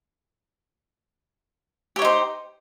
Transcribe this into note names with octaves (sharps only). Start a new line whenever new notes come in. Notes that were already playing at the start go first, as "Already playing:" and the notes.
D#4 G4 C5 C#5